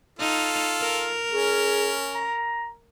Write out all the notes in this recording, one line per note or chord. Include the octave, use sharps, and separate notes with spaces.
D#4 F4 A4
A#4
C#4 G#4
A#5